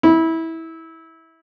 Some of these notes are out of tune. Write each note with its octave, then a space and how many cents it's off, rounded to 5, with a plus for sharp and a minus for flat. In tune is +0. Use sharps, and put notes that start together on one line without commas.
E4 -20